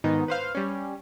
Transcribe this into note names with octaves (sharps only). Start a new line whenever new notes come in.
G#2 D#3 B3 D#4
B4 C5 F5
G3 C#4